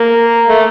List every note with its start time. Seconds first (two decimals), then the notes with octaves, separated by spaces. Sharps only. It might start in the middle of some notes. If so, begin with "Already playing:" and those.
Already playing: A#3
0.49 A3